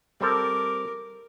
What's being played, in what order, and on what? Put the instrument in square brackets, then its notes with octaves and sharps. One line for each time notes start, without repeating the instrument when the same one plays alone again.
[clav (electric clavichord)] G3 C4 A4 [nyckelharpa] A#4 D6